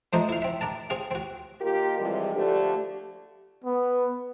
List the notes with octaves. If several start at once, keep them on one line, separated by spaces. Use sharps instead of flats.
F3 A3 D4 D#4 C5 D#5
E4 F5
C4 E5
D4 A#4 A5
C4 G#4 F5
C4 F#4
D#2 A#3 F4 G4 A#4
C3 E3 F3 G3 G#3
D3 F3 A3 D4 G4
B3